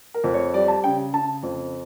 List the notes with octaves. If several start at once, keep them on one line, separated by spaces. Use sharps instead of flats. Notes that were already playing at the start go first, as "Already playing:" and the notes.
A#4
F2
C#5
G3 D5
A5
C#3 G5
C#3 A5
F2